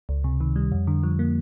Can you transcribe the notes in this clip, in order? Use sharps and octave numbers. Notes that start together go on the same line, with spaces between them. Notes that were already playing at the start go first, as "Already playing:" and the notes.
C#2
C3
D#3
G3
F2
D3
F3
A#3